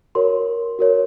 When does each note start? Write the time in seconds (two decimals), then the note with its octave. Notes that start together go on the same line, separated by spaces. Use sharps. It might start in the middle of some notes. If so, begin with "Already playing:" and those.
0.15 F#4 A#4 C#5 C6
0.79 F#4 A#4 C#5